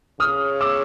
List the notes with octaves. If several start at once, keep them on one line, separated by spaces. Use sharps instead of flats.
C#3 D#6 F6
D6 E6